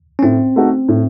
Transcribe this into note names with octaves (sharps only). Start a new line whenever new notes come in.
C#4
A2 C4
A3 D#4 F#4 A4
A2